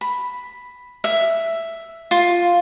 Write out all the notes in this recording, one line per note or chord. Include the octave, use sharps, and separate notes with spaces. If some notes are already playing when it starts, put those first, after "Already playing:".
B5
E5
F4